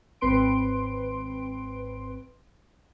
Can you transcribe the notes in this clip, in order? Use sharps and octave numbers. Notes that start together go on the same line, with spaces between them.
G#1 C4 B4 C6 D7